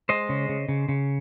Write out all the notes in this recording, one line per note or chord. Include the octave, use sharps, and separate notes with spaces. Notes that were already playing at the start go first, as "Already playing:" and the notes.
G#3 C5 D#5
C#3
C#3
C#3
C#3